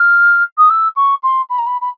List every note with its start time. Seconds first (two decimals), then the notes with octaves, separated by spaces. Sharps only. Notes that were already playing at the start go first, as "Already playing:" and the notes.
Already playing: F6
0.58 D#6
0.70 E6
0.96 C#6
1.23 C6
1.50 B5
1.59 A#5
1.67 B5
1.81 B5